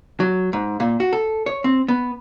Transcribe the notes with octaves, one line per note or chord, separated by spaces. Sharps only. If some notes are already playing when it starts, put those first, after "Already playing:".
F#3
G#2
A#2
F#4
A4
C#5
C4
B3